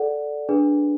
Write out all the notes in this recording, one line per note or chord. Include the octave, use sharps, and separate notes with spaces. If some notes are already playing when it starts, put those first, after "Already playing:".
Already playing: A4 D5 F#5
D4 G#4 B4